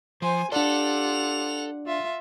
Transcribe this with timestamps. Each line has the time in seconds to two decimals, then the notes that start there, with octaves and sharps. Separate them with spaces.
0.22 F3 C5 G#5
0.52 D4 F4 G4 A4 D5 F#5 F7
1.86 F4 E5